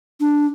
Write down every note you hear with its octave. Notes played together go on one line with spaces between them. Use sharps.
D4